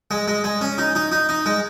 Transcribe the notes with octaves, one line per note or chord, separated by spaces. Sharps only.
G#3
G#3
G#3
C#4
D#4
D#4
D#4
D#4
G#3